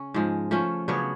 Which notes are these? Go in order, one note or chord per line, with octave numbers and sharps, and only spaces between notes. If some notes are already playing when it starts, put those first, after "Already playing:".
Already playing: C#3 C#4
G#2 F3 G#3
F3 A3 C#4
C#3 F#3 B3 D4 C#5